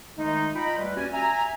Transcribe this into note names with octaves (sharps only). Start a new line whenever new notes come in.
D#3 G#3 A3 D#4
F4 D#5 G5 A#5 B5
D#2 G3 A3 B4
C#4 F#4 G4 D5 G#5
E5 G#5 A#5